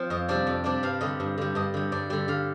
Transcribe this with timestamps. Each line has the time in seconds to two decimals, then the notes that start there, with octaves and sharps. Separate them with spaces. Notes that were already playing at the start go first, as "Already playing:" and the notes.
Already playing: F3 C4
0.10 F2 D#5
0.28 C3 G3 D4 D5
0.47 F2
0.64 C3 G3 D4 D5
0.83 G2 F5
1.01 D3 G3 D#5
1.20 G2
1.38 D3 G3
1.55 G2 D#5
1.74 D3 G3
1.92 G2 D5
2.10 D3 G3 D5
2.28 D3 F5